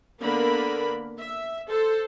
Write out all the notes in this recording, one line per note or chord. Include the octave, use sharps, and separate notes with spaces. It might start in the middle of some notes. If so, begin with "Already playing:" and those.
D3 A#3 B3 A#4 B5
E5
A4 C5